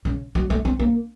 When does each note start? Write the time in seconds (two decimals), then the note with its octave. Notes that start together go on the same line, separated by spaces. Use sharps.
0.05 C#3
0.35 F#3
0.50 A3
0.65 C4
0.80 A#3